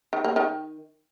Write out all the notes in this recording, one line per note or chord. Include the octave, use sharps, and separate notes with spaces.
D#3
A#3
D#3